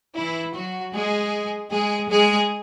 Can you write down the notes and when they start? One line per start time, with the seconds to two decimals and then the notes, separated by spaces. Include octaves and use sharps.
0.16 E3 E4
0.55 F#3 F#4
0.94 G#3 G#4
1.71 G#3 G#4
2.09 G#3 G#4